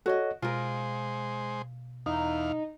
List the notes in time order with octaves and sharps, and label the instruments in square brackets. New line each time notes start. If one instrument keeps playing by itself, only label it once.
[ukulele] F#4 D#5 [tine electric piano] A4 C#5
[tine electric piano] B2 [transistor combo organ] G#3 C5 [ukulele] F4 A#4
[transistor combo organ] E2 F5 [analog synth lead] D#4